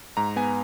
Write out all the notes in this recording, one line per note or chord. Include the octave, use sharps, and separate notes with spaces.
G#2 A#5
B3 G#5